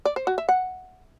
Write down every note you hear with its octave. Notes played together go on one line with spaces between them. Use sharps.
D5
C5
F#4
E5
F#5